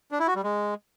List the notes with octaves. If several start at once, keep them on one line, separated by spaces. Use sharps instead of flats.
D4
E4
F#4
G3
G#3